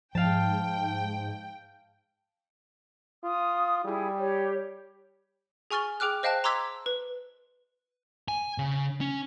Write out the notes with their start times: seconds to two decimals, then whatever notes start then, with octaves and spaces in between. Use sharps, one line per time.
0.15 G#2 F3 F5 G5 A5
3.24 F4 D#6
3.85 G3 E4 G#4
4.19 G4 C#5
5.71 G#4 G#5 C#6 F6 A6 G7
6.00 G#4 G5 D6 F6 F#6
6.23 C5 D#5 F5 G5 A5 F#6
6.44 A#5 C6 D6 E6 G#6 B6
6.86 B4
8.28 G#5
8.58 C#3
9.01 C#4